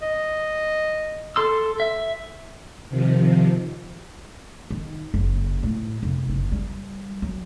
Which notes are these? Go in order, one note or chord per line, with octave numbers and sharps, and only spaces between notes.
D#5
A4 C6 E6
E5
C3 D#3 F3
D#3
F#1
A2
F1
F#1
G3
F#3